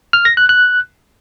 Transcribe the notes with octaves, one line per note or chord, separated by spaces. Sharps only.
F6
A#6
F#6
F#6